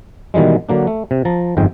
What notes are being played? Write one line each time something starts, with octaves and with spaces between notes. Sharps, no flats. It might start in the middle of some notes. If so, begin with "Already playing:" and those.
B2 D#3 E3 G3 G#3
D3 F#3 A#3 D4
A3
C3
F3 A5 A#5
G1 F2 G#2 G#3 G5